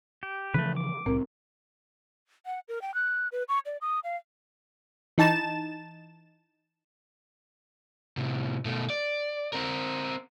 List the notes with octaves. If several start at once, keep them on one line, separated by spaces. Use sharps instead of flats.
G4
C#3 E3 F3 A3 B4
D6
C2 A2 C4 A#4
F#5
A#4
G5
F#6
B4
C#6
D5
D#6
F5
E3 D#4 A5 A6 E7
A2 C3
B2 A3
D5
C4 A#4